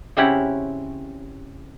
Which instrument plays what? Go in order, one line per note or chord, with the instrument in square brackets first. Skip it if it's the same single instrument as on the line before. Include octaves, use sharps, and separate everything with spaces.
[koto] C#3 C4 C#4 E4 G4 F#5